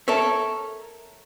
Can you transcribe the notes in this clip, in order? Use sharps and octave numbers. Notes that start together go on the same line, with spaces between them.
A4 A#4 C#5 E5